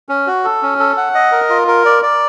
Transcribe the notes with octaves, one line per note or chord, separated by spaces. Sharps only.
C#4
F#4
A4
C#4
A4
F#5
D#5
A#4
F4
A#4
D5
D5